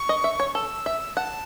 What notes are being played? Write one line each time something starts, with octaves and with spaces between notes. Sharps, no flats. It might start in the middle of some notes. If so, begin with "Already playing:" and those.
Already playing: C#6
D#5
E5
C#5
A4 E6
E5
F#5 A5